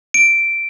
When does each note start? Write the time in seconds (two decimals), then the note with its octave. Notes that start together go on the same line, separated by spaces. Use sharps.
0.14 D7